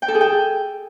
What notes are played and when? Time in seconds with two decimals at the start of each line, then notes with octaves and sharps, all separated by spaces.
0.02 G5
0.08 A4
0.15 G#4
0.21 G5